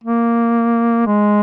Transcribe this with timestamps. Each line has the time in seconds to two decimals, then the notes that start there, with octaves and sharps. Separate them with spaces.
0.04 A#3
1.07 G#3